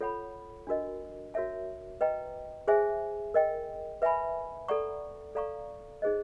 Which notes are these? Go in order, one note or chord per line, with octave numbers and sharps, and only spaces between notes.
F4 A4 C#5 F#5 B5
D4 F#4 A#4 D#5
F#4 A#4 C#5 E5 A5
B4 D#5 G5 A#5
G#4 C5 E5 G#5
A#4 D#5 G5
B4 E5 G#5 B5
A4 D5 F#5 A#5 C#6
A4 D5 F5 A#5 C#6
D#4 G#4 C5 D#5